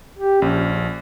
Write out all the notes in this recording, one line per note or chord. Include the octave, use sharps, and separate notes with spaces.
G4
A#1 C#4